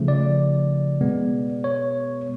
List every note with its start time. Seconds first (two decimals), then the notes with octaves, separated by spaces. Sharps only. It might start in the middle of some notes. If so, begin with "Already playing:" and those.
Already playing: C#3 F3 A3
0.08 D5
1.01 B2 G#3 B3
1.64 C#5